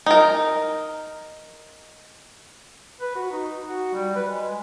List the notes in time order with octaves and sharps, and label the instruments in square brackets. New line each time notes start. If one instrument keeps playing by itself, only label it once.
[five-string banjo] D#4 A#4
[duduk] B4
F#4
D#4
F#4
G3
B4
G#3